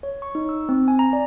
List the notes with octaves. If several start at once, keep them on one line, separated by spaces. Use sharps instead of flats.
C#5
C#6
D#4
E6
C4
G#5
A#5
D5